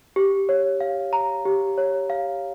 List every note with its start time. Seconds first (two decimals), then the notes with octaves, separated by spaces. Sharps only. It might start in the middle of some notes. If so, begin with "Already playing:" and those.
0.16 G4
0.49 C#5
0.80 F5
1.13 A#5
1.45 G4
1.78 C#5
2.10 F5